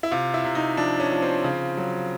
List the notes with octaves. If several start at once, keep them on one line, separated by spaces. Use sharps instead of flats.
E4
C3 F4
E4
C3
D#4
F3 D4
C#4
F3
C4
C#3
F#3